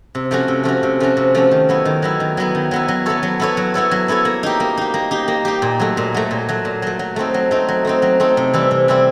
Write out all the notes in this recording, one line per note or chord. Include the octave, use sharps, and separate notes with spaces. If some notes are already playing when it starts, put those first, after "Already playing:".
C3
F3 A3 C#4 F#4
C3
F3 A3 C#4 F#4
C3
F3 A3 C#4 F#4
C3
F3 A3 C#4 F#4
D#3
F#3 B3 E4
D#3
F#3 B3 E4
D#3
F#3 B3 E4
D#3
F#3 B3 E4
F#3
B3 E4 A4 C#5
F#3
B3 E4 A4 C#5
F#3
B3 E4 A4 C#5
F#3
B3 E4 A4 C#5
A#3
D#4 G4
A#3
D#4 G4
A#3
D#4 G4
A#3
D#4 G4
A#2
F#3 A3
A#2
F#3 A3
A#2
F#3 A3
A#2
F#3 A3
F#3
A3 C4 D#4
F#3
A3 C4 D#4
F#3
A3 C4 D#4
F#3
A3 C4 D#4
C3
E3 G3 C4 E4
C3
E3 G3 C4 E4